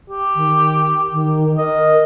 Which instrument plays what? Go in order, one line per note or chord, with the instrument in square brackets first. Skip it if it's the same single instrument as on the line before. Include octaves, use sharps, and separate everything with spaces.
[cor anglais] G4
[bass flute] D#3
D#3
[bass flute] A#4 [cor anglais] D#5